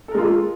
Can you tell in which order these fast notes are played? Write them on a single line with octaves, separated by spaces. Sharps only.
A4 A#4 G#3 F4